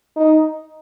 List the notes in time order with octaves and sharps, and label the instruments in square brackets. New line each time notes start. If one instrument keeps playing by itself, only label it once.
[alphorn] D#4